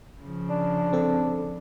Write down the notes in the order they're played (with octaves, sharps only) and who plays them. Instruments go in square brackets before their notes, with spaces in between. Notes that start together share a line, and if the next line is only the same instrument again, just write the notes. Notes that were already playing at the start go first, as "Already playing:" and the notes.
[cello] C#3 F3
[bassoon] D4
[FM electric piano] C4 A4